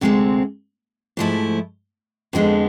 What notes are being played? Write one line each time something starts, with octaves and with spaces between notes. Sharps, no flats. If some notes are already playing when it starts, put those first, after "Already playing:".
D2 C3 G#3 C4
G#2 F3 A3 E4
F2 D3 G#3 B3